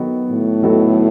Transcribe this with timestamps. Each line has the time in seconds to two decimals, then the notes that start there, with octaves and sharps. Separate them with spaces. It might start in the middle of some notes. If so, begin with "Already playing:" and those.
Already playing: D#3 F#3 B3 F#4 A4
0.32 A2
0.62 D#3 F#3 B3 F#4 A4